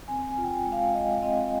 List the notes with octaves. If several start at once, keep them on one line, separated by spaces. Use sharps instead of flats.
C4 G#5
G#5
F4
G5
G#5
G#3
F5
G#3 D#5
C4 D#5